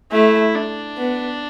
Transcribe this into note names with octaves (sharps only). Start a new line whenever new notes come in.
A3 E4
D4
B3